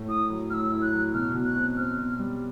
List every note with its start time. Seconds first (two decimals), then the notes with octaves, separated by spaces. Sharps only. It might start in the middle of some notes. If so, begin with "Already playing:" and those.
Already playing: A2
0.08 E4 D#6
0.29 F#3
0.50 A2 E6 F6
0.72 E4
0.82 F#6
0.93 F#3
1.14 B2 F6
1.34 B2
1.45 F#6
1.56 C4
1.77 C4 F6
1.98 B2
2.19 G3